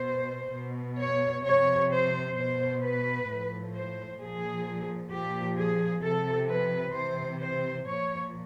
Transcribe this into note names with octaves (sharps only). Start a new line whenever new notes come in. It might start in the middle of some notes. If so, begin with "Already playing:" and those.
Already playing: B2 C5
B2
C#5
C3 F3 C#5
C5
B2 C5
B4
A2 F3
C5
A#2 F3 G#4
A#2 F3 G4
G#4
C3 F3 A4
B4
C3 E3 C5
C5
A#2 F3 C#5